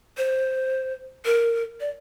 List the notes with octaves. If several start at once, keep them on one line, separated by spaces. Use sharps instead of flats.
C5
A#4
D5